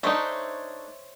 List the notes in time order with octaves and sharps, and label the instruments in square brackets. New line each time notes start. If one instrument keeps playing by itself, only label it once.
[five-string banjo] A3 D4 D#4 [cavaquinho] C5 C#5 E5